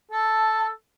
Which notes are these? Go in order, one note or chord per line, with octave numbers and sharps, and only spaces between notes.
A4 A5